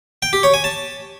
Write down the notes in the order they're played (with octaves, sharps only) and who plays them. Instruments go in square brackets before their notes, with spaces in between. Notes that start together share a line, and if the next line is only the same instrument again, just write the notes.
[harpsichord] G5
G4
C#5
G#5
A5